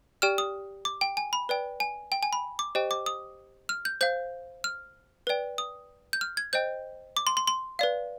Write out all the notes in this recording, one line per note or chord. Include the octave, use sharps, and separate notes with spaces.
G4 D5 G5 F6
D#6
D6
G5
G#5
B5
B4 D5 G5
G#5
G5
G#5
B5
D6
G4 C5 D#5 G5
D6
D#6
F6
G6
C5 F5 G6
F6
B4 D5 G5
D#6
G6
F6
G#6
C5 D#5 G5 G6
D6
C6
C6
C6
B4 D5 F5